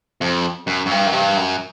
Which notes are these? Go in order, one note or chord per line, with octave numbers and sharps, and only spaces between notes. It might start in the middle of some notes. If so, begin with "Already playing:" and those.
F2
F#2
F#2
G2
F#2
G2
F#2